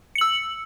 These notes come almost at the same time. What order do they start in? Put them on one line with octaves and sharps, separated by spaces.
C#7 F#7 E6